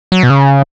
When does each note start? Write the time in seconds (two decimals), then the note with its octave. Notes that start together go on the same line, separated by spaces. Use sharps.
0.12 F#3
0.23 B2
0.30 C#3